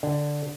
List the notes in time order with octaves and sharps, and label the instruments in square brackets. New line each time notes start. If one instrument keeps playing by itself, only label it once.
[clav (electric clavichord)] D3